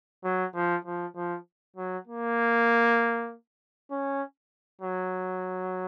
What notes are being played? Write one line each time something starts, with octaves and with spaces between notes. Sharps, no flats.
F#3
F3
F3
F3
F#3
A#3
C#4
F#3